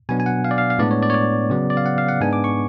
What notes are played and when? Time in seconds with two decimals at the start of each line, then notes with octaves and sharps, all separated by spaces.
0.09 B2 F#3 B3 D4 G#5
0.20 G#5
0.26 F#5
0.45 F5
0.51 D5
0.58 F5
0.70 F5
0.79 A2 G#3 B3 D4 D5
0.91 C#5
1.03 D5
1.10 C#5
1.14 D5
1.50 C#3 F#3 B3
1.70 D5
1.77 F5
1.86 F#5
1.98 F5
2.09 F#5
2.20 G#2 G#3 B3 D4 G#5
2.33 D6
2.44 C#6